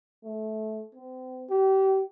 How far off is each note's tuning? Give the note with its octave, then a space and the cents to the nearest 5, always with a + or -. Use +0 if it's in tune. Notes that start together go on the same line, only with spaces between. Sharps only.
A3 -20
C4 -35
G4 -30